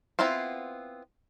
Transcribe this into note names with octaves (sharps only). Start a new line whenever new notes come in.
B3 C4 E4 F4 C5